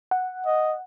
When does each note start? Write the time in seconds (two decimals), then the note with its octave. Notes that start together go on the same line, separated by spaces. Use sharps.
0.11 F#5
0.46 D#5